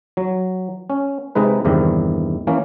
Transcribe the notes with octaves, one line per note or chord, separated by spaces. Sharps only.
F#3
C#4
C3 G#3 D#4 B4
E2 G2 C3 D#3
E3 A#3 C#4